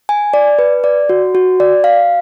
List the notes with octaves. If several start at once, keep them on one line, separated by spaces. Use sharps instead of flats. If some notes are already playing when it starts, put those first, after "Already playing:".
G#5
D5
B4
D5
F#4
F#4
D5
F5